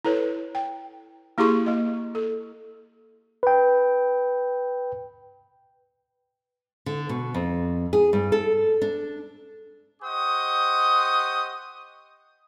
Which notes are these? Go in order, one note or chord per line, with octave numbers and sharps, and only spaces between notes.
E4 A4 B4 C#5
G5
A#3 E4 G4 G#4 C6 C#6
A#3 D#5
A4
B4 G5
D3
B2
F2
G#4
G2
A4
D4
G4 C5 D#5 F#5 C#6 D#6